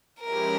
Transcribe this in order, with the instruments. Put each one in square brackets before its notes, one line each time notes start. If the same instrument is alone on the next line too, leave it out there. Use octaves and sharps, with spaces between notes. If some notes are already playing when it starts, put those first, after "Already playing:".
[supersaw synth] F3 G#3 C#4 E4 G4 [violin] A#4